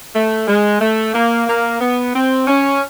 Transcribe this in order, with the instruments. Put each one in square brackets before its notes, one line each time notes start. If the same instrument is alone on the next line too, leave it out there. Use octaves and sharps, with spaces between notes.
[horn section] A3
G#3
A3
A#3
A#3
B3
C4
C#4